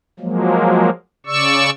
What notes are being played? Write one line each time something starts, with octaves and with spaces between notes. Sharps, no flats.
F3 F#3 G#3 A#3
C#3 D5 C#6 E6